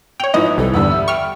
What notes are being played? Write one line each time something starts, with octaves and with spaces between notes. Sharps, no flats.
C#5 G5 F7
G#2 E3 F3 E4 B4 D#5 D#6
C2 A4
E2 G2 D3 G3 B3 E6
E5
G5 C#6 F6